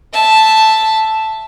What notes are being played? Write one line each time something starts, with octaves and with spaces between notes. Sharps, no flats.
E5 A5